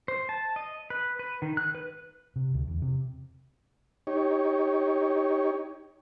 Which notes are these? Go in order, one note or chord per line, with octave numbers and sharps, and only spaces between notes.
C5
A5
D#5
B4
B4
D#3
F#6
B4
C3
D2
E2
C3
D#4 G4 C#5